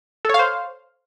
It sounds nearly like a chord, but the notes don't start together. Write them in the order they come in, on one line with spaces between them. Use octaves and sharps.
A4 C#5 F5 C5